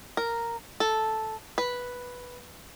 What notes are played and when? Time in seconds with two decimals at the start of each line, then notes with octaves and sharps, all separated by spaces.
0.17 A#4
0.80 A4
1.58 B4